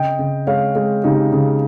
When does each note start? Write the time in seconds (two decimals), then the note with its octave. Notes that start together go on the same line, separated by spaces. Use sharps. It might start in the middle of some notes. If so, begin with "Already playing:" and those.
Already playing: C#3 D#5 G5
0.19 C#3
0.47 G#3 C#5 F5
0.75 G#3
1.04 C#3 D#4 G4
1.32 C#3